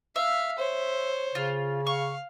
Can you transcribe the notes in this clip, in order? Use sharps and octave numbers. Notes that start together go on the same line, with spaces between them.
E5 F5
C5 C#5
C#3 F4
F5 C#6